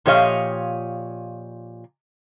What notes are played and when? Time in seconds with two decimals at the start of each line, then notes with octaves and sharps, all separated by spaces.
0.06 A#2 F3 G4 C#5 D#5 F5